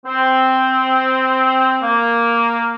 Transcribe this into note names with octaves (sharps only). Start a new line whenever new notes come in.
C4
A#3